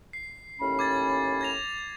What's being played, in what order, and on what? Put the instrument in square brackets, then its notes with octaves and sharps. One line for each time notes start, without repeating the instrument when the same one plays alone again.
[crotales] C7
[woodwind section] D#2 A2 C#4 [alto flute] B5
[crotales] D6 G#6 A6
G#6 A#6 F7